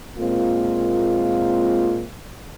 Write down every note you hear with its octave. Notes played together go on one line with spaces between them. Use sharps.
A#2 G#3 A#3 C4 F4